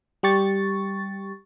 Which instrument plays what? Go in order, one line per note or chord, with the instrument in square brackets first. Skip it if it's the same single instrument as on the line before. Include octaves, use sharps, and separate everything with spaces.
[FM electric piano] G3 G4 C#6 A6